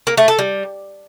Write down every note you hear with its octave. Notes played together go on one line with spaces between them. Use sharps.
A#3
A3
A4
G3